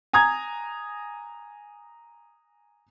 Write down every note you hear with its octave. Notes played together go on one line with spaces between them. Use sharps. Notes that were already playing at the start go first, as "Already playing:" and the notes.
G#5 A#5 D#6 G#6